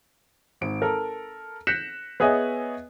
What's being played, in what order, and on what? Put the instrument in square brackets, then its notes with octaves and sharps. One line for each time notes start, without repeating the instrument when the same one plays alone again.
[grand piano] G#1 D7
A4 A#4
F#6 G6 A#6 B6 C#7 E7
B3 G#4 C#5 D#5 E5 G#5